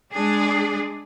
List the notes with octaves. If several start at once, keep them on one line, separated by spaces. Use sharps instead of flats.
G#3 D4 G#4